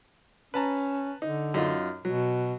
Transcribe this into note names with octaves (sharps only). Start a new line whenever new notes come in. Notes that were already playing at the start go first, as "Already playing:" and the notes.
C#4 B4 A5 A#5
D3 D#4
F#2 D#4 F4
B2 F#3